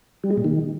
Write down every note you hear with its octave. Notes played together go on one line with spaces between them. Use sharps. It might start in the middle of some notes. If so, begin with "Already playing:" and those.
G3
G#3
A#2
D#3